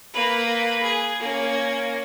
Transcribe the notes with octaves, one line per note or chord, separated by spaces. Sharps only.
A#3 B4
G#4
A#3 C#4